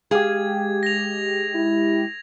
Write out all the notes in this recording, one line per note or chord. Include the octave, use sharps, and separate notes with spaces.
G#3 G4 G#4 F5 G#6
A#6 F7
E4